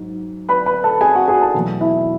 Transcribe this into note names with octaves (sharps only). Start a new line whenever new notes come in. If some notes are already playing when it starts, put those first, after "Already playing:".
Already playing: G#2 F#3
B4 B5
B4 B5
A4 A5
G#4 G#5
F#4 F#5
G#4 G#5
A4 A5
E2 B2 F#3 A3
E4 E5